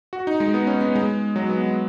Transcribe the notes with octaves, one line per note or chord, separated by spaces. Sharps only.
F#4
D#4
G#3
B3
C#4
B3
G#3
F#3
B3
G#3